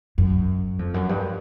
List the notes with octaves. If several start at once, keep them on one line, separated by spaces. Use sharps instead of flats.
F#2
F2
F#2
G2